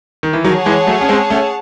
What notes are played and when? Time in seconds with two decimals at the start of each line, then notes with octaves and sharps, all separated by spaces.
0.23 D#3
0.33 E3
0.44 D#3 F#3 G#4 C#5 F#5 A5
0.66 E3 G#3
0.87 F#3 A3
1.01 C#4
1.09 G#3 C4
1.30 A3 C#4